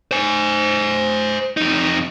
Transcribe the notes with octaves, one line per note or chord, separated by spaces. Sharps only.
C5 G#5
F2 D#4